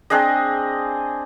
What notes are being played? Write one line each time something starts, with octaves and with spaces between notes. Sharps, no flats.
C4 D4 G#4 D#5